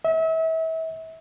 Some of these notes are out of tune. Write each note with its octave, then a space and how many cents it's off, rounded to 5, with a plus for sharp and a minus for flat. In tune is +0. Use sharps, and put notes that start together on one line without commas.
E5 -35